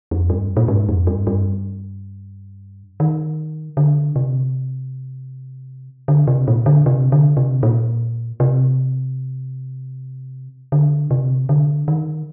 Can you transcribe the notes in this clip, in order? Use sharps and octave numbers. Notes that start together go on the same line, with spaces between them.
F2
G2
A#2
G#2
F2
G2
G2
D#3
D3
C3
D3
C3
A#2
D3
C3
D3
C3
A#2
C3
D3
C3
D3
D#3